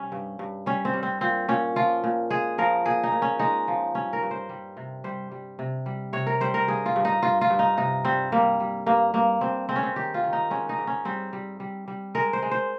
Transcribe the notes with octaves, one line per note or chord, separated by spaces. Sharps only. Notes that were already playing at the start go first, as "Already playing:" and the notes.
Already playing: C3 G3 C#4
G2
G2
G3 C#4
C4
G3
C4
A#2 C4
A#2 C#4
F3 F4
A#2
G#3 G#4
F3 A#4
A#2 G#4
D#4
A#2
C#4
G#3 D#4
F3
G2 C#4
A#4
G2
C5
G3
C3
G3 C5
G3
C3
G3
C3 C#5
A#4
G3 C5
A#4
G2 G#4
F4
G2
D#4
G2 F4
F4
G2
D#4
C3 D#4
G3 C4
G3 A#3
G3
G2 A#3
G2 A#3
G2 C4
G#3 C4
C#4
C4
D#3 G4
F4
D#3
D#4
G#3 C#4
D#4
G#2
C#4
G3 C4
G3
G3
G3
G#3 A#4
C5
G#3
C5